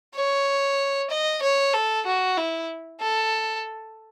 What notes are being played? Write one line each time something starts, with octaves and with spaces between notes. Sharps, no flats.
C#5
D#5
C#5
A4
F#4
E4
A4